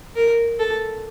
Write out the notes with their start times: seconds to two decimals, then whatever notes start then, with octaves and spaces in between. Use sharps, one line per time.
0.16 A#4
0.59 A4